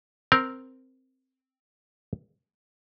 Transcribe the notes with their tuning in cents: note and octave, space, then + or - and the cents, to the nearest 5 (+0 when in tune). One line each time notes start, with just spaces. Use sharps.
C4 +0 A#4 +0